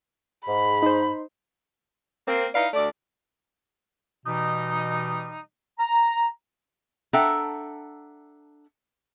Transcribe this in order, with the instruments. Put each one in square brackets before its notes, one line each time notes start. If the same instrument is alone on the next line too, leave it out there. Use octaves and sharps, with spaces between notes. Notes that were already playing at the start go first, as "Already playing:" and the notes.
[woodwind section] G#2 [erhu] B5
[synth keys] D#4 C5
[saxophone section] A#3 C4
D#4 E4 B4 D5 F5
D2 A3 D5
[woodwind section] B2 E3 G3 D#4
A#5
[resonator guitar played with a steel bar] D4 A4 E5 F#5 G5 A#5